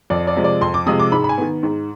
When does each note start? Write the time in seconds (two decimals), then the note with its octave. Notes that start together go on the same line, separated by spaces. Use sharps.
0.10 F2 D5
0.27 D5
0.36 C3 F3 G#3
0.44 D5
0.61 F2 C6
0.74 D6
0.86 C3 F3 G#3 D#6
0.99 D6
1.12 G#2 B5
1.24 B5
1.29 G#5
1.38 D#3 B3
1.63 G#2